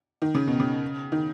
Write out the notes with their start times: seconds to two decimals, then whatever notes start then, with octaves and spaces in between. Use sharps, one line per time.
0.22 D#3
0.35 C#3
0.47 B2
0.60 C#3
1.12 D#3